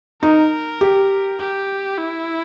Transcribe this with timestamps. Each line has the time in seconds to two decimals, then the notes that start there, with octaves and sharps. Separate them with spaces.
0.22 D#4 A#4
0.81 G4
1.39 G4
1.97 E4